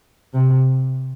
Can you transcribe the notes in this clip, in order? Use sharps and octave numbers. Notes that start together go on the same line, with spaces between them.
C3